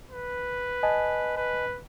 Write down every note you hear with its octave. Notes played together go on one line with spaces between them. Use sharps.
B4
D#5 G#5 A5
B4